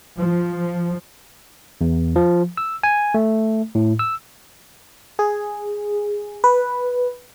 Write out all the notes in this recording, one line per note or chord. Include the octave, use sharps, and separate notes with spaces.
F3
E2
F3
E6
G#5
A3
A2
E6
G#4
B4